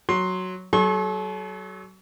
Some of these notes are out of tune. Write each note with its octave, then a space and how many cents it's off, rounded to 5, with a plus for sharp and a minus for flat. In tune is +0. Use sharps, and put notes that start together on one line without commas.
F#3 +0 C6 +10
F#3 +30 A4 -40 C#6 -45